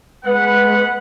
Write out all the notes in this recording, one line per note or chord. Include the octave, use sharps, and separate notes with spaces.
G#3 B3 B4 F#5